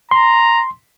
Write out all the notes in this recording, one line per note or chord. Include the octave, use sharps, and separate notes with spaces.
A#5 C6